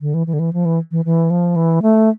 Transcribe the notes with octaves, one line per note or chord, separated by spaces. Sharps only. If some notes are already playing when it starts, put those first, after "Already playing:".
D3
E3
E3
D3
E3
F3
E3
E3
E3
F3
E3
A3